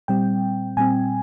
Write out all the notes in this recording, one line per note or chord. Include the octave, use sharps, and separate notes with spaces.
A#2 G3 C4 G5
A#2 G3 C4 G#5